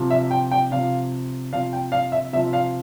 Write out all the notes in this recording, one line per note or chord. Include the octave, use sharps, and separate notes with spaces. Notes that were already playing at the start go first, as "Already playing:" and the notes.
Already playing: C3 F3
E5
G5
G5
C3 F3 F5
C3 F3 F5
G5
F5
E5
C3 F3 E5
F5